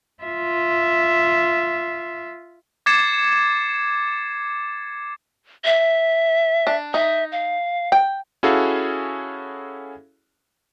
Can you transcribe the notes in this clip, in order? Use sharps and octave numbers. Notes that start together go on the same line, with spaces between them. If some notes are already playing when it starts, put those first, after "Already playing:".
F4 E5
D6 G#6 A6 C7 C#7 E7
E5
D4
D#4 E5
F5
G5
C#4 E4 F#4 G#4 A4 F5